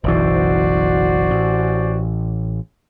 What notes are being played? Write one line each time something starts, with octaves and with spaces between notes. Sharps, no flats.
F#1 B1 E3 F#4 C5 D5
A1